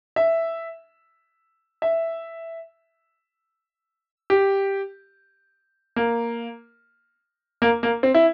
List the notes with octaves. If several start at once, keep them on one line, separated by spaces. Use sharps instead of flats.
E5
E5
G4
A#3
A#3
A#3
C4
E4